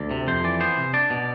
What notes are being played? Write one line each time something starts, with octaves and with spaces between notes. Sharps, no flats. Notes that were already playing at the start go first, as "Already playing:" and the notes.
Already playing: D2 D5
C3
F2 C5
E3 D5
B3 C5
C3
D4 D5
B2